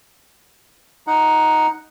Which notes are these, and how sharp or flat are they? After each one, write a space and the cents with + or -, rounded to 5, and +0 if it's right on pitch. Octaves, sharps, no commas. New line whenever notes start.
D#4 +0 F#5 +0